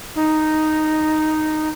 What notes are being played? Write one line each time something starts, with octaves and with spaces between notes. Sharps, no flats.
D#4